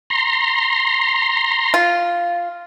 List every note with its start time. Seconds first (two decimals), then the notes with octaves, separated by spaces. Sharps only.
0.10 A#5 C6
1.74 F4